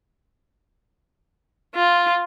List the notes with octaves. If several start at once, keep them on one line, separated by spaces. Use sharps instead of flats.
F4